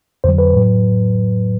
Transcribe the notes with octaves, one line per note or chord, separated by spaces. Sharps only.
F2 D3 F#3 C5
B4
A2 F#3